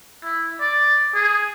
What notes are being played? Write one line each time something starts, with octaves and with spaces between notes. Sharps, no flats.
E4
D5
G#4